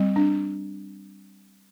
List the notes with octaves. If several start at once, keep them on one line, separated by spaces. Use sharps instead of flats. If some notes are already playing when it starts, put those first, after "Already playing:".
Already playing: G3 C4
D4